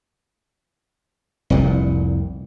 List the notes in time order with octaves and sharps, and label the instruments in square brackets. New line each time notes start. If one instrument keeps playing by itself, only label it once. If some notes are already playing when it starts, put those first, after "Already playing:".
[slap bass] F1 C2 A#2